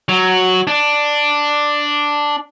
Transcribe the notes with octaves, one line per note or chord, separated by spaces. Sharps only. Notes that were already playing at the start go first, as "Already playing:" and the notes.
F#3
D4